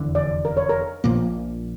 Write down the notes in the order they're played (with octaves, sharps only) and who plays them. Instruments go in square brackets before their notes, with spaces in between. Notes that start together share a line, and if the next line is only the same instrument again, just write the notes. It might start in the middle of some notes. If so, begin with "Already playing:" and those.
Already playing: [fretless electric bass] F1 E2 D3
[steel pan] D5
A#4
C#5
A#4
[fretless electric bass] A#1 A#2 F3 A#3